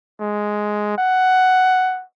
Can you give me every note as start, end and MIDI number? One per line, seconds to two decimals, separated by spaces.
0.20 0.95 56
0.98 2.03 78